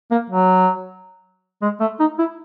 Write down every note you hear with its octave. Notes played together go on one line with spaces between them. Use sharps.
A#3
F#3
G#3
A3
D#4
E4